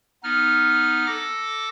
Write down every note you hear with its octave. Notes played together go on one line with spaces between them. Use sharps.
B3 D#4 F6
A4 D6 A#6